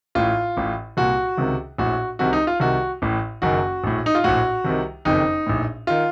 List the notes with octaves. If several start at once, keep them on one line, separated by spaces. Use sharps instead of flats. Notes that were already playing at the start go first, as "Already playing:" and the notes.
A1 A2 F4
A1 A2
C2 A#2 F#4
C#2 C3 D#3
A#1 A2 F#4
C2 C3 D#3 F#4
D#4
F4
C2 C3 D#3 F#4
A1 A2
F#1 F#2 D#3 F#4
A#1 A2
D#4
F4
A#1 A2 F#4
C2 C3 D#3
F#1 F2 D#3 D#4
A#1 A2
D#3 F4